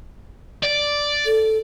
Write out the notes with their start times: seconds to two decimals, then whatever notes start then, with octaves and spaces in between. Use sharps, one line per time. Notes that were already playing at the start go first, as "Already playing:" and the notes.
0.63 D5
1.26 A4